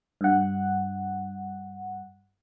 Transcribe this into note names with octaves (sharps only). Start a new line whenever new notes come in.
G2 F#5